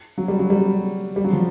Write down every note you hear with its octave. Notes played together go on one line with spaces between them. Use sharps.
F#3
G3
F#3
G3
G3
F#3
F3